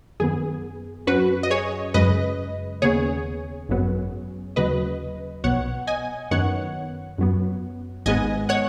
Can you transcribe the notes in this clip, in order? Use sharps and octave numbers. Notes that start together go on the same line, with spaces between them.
F#2 D#3 B3 G#4
F#2 F#3 C#4 F#4 B4
D#5
G#4 C#5
F#2 C#3 G#3 B4 D#5
D#2 C#3 B3 G#4 C#5
G#1 F#2 F#3 B3
D#2 C#3 F#3 B4 D#5
B1 B2 B3 C#5 F#5
D#5 G#5
F#2 D#3 B3 C#5 F#5
F#2 F#3 B3
G#1 G#2 G#3 B3 D#5 G#5
C#5 F#5